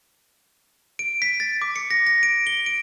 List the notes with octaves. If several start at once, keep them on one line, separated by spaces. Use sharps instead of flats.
D7
B6
A6
D6
C#7
A#6
A#6
D7
G7
D7